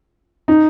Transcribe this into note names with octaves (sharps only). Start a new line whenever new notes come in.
D#4